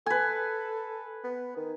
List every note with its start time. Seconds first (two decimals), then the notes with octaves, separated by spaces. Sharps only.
0.06 A4 B4 G#5
1.24 B3
1.57 D#3